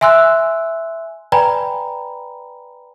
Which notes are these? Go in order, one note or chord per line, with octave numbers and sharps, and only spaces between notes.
E5 G#5 C6 E6 F#6
B4 D5 G5 G#5 A#5 B5